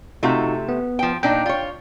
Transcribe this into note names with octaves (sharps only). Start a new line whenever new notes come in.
C3 A3 D#4 F4 F#4
B3
F3 G5
A#2 D4 D#4 G5
F4 C#5